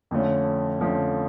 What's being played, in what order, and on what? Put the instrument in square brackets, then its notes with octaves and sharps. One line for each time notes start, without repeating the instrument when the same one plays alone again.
[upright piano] F2 D3 F3 A3 C#4
F2 D3 F3 A3 C#4